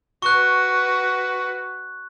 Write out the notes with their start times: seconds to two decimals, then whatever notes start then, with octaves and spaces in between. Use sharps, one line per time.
0.22 F#4 B4 C#6 F#6